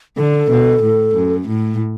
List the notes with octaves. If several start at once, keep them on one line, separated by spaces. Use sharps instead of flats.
D3 A4
B2
A2
F#2
A2